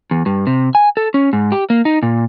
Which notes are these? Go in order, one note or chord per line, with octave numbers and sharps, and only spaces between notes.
E2
G2
C3
G#5
A4
C#4
G#2
G4
A#3
D#4
A#2